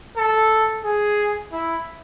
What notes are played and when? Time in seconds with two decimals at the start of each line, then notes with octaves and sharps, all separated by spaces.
0.17 A4
0.85 G#4
1.52 E4